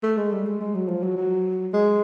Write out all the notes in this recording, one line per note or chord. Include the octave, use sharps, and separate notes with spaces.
A3
G#3
G3
G#3
G#3
F#3
F3
F#3
F#3
G#3